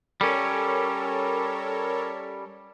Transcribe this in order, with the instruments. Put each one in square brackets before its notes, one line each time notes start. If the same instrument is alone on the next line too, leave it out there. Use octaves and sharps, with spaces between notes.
[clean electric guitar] G3 C#4 [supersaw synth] A4 A#4 C#5